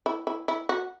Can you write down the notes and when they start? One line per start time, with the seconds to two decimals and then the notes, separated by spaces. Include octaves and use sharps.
0.06 E4
0.27 E4
0.48 E4
0.69 F#4